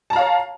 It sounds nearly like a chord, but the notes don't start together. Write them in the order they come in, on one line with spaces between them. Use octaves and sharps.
A5 A#5 F5 C#5